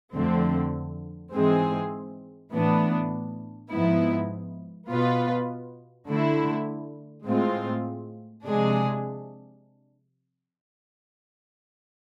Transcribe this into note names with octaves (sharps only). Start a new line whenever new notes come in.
F2 D3 A3 C4
G#2 E3 G#3 C4 G#4
A2 E3 B3 D4
G#2 F3 B3 E4
B2 B3 F4 B4
D3 A3 E4
A2 G#3 C4 F4
C3 F3 G#3 D4 G#4